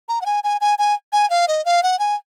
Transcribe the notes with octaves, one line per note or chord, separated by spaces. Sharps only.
A#5
F#5
G#5
G#5
G#5
G#5
G#5
F5
D#5
F5
F#5
G#5